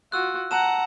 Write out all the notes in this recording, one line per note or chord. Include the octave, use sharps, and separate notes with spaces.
F4 F#4 E6 F#6
F#5 A5 A#5 E7